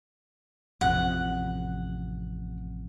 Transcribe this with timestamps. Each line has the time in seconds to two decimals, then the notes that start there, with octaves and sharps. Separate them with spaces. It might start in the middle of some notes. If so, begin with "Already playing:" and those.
0.81 A1 F2 C3 F#5